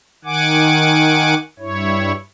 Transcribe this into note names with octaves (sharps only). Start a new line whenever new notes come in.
D#3 F#5 G#5 D6
G2 E4 C#5